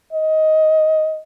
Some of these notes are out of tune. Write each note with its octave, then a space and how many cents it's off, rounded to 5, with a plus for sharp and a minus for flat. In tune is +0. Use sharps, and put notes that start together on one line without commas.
D#5 +10